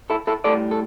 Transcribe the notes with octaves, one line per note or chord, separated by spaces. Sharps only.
E4 A4
E4 A4
A2 G3 A4 D5
A4